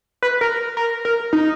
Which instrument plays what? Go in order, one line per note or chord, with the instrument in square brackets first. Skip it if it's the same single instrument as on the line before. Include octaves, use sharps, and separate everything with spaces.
[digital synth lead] B4
A#4
A#4
A#4
D#4